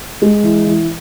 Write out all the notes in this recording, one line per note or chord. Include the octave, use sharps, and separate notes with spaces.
G#3
E3
E3